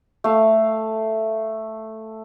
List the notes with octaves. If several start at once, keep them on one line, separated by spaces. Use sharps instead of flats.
A3 F5